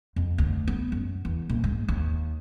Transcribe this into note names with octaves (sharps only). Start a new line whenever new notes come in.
F2
D2
B3
F#2
E2
A#1
G#2
D#2